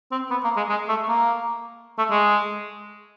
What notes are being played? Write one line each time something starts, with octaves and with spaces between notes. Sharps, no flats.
C4
B3
A#3
G#3
G#3
A3
A#3
A3
G#3